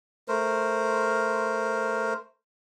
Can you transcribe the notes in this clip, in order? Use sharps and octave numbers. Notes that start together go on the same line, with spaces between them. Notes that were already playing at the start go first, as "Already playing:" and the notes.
A3 A#4 C5